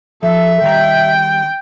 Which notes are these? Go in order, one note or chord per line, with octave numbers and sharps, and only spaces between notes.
F3 A4 E5
D#3 G3 G5 A#5